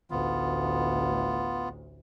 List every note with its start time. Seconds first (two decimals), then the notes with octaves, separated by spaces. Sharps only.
0.11 A1 D2 B3 F4